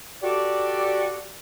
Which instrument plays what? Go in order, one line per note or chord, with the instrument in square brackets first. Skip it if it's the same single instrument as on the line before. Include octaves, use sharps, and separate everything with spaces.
[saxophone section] F#4 G4 A4 D5